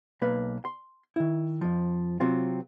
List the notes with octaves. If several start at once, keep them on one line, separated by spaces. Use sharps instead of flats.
B1 A#3 B4
C6
D#3 E4
F2 F3
C3 F#3 C4 F4